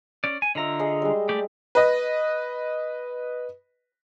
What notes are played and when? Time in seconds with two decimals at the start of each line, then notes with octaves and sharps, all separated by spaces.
0.24 C#4 D5
0.42 G#5
0.55 D3 F4 D#5 E5 A#5
0.79 G#4 D#5
1.02 G3 G#3
1.29 A3 G4 D5
1.75 B4 D#5